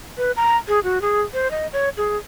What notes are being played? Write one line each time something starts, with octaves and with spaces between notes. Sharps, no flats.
B4
A#5
G#4
F#4
G#4
C5
D#5
C#5
G#4